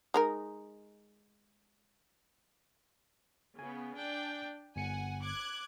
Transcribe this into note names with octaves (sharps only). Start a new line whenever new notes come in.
G#3 D#4 A#4
C#3 B3 G#5
D4 G5
G1 F#5 G#5 C#7
D6 F#6 G#6